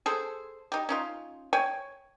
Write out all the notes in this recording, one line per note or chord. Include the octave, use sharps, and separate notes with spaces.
G#4 A4 C5
D#4 G4
C#4 D#4 F4
C#5 G5 G#5